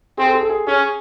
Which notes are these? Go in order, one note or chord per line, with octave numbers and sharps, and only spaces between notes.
C4 G#4
A4
G#4
A4
G#4
C#4 G#4